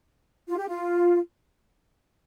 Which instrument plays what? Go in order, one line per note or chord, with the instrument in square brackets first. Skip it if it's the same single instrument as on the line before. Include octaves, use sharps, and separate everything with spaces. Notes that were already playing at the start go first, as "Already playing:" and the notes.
[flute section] F4
G4
F4